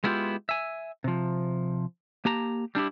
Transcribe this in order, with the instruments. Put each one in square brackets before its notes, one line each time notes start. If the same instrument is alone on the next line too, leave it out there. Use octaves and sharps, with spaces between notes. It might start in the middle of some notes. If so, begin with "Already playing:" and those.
[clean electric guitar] G#3 B3 E4 F4 G4
E5 G#5
C3 F3
A#3 G4 A5 A#5
G3 D4 E4 G4